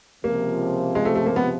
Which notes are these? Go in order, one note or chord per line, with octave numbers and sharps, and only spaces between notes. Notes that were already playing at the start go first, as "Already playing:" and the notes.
C#2 C3 F3 A#3
G#3
A3
A3
A#3
B3